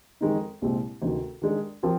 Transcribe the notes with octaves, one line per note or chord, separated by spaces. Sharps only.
F2 D#3 G#3 D#4
C2 A#2 G#3 C4 G4
D2 C3 D#3
D#3 G#3 D4
F3 C4 G4 A#4